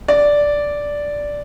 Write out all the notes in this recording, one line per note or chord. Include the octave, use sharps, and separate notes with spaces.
D5